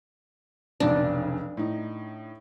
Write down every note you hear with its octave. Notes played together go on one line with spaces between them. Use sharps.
F1 B1 C#3 D4
A2 D#4